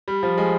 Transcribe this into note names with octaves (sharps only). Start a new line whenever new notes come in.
G3
F3
G#3